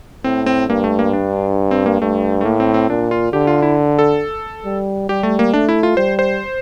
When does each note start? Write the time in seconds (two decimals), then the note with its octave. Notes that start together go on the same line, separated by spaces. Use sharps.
0.24 A2 C4
0.46 C4
0.69 G2 A#3
0.84 A3
0.99 A#3
1.13 D4
1.71 C4
1.86 A#3
2.01 G2 A3
2.41 A3
2.45 A2 A#3
2.60 C4
2.74 C4
2.90 A#2 D4
3.11 F4
3.33 D3 G4
3.47 F4
3.62 E4
3.99 A4
4.65 G3
5.09 G3 G4
5.23 A3
5.39 A#3
5.54 A3 D4
5.69 E4
5.83 F4
5.97 G3 C5
6.19 C5